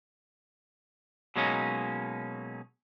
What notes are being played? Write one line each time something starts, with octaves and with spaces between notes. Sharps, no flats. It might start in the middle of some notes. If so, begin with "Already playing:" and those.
B2 F#3 G#3 A#3 C#4 D#4